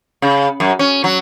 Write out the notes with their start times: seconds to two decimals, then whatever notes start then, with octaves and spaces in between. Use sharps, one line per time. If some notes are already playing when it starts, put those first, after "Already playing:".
0.22 C#3
0.60 F#2
0.79 C#4
1.04 F#3